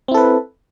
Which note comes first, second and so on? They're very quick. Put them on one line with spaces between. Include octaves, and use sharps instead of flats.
C4 E4 A4 B4